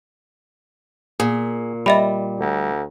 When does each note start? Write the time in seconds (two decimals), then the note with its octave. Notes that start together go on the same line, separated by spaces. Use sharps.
1.20 A#2 G#4
1.86 G3 D#5 E5 B5
2.39 D2